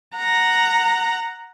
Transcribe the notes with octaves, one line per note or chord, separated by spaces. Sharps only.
F#5 A#5